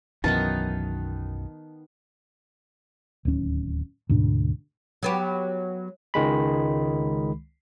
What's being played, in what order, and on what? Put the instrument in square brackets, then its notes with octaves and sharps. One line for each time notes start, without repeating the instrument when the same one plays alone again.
[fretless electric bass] B1 F#2 E3 [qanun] D#3 B3 D#4 [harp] A5
[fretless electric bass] D1 D#2 C#4
D2 G#2 B2 D4
[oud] F#3 B3 G4
[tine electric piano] C#2 D#3 G#3 B5